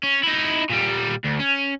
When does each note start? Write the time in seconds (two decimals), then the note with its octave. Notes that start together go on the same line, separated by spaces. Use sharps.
0.03 C#4
0.23 D#4 E4
0.69 A#2 G3
1.25 D2
1.40 C#4